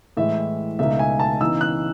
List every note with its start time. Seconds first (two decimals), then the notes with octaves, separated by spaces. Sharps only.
0.17 A2 E3 G#3 E5
0.79 C#2 B2 A3 D#4 E5
0.99 G#5
1.20 A5
1.41 C#3 E3 B3 D#4 E6
1.61 F#6